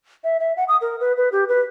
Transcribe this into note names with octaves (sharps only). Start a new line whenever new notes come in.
E5
E5
F#5
D#6
A#4
B4
B4
G4
B4